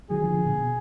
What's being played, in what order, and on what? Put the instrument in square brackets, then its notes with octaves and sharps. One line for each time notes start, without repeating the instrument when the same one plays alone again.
[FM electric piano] D#3 F#3 [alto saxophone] G#4
[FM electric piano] D3 F3
D3 F3
A#2 D3
B2